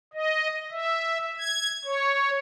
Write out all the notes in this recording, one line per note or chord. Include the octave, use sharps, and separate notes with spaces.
D#5
E5
G#6
C#5